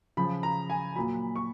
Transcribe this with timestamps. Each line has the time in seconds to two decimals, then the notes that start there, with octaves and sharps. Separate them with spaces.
0.17 C#3 F3 B5
0.43 A#5
0.70 G#5
0.95 A#2 F#3 B5
1.36 C#6